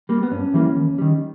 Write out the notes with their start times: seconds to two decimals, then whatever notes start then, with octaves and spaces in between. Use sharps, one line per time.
0.09 G3 A#3
0.23 B3
0.32 G2 C#4
0.54 E3 G3 A#3
0.77 D#2
0.98 D#3 G3